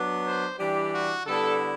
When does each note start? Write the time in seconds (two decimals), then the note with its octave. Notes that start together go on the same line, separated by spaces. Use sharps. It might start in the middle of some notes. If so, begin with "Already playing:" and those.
Already playing: F#3 B3 D4
0.25 C5
0.59 E3 G3 D4 G4
0.93 F#4
1.26 D3 G3 B3 E4 A4